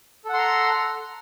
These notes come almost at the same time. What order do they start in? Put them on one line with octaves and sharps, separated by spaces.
A4 F#5 C6 A#5